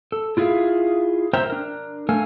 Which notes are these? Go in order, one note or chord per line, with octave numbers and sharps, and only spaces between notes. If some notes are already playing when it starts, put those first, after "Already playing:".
A4
E4 F4 G#4 E5 F5
A#4 C5 E5 G5 A#5
D4 A#4
A3 A4 A#4 F5 G#5